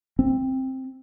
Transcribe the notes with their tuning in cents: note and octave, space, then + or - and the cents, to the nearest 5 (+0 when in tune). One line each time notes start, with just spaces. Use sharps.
C4 +10